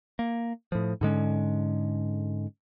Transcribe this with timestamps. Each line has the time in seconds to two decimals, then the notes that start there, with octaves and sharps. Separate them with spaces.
0.19 A#3
0.72 A2 F3
1.01 G#2 D3 G#3 C#4